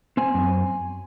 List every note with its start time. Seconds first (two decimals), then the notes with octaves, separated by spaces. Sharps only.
0.17 C4 G#5
0.34 F#2